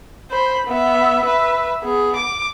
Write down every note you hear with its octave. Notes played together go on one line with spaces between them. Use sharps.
C5 B5
B3 E5
B4 E5
B3 G#4
D6